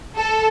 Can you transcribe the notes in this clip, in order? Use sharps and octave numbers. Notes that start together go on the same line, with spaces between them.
A4